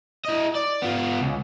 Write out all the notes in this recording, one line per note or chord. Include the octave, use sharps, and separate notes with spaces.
E4 D#5
D5
B3 F4
C#2